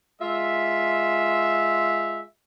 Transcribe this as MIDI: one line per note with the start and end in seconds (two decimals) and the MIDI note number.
0.21 2.21 56
0.21 2.21 65
0.21 2.21 76